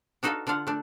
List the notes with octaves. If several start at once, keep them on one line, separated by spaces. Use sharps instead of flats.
D4 D#4 F#4 A4 B4 F5
D3 D4 F4 F5 F#5
A3 D4